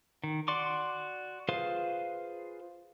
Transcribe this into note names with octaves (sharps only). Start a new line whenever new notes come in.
D#3
F#4 D5 C6 D6
F4 G#4 B4 C5 F5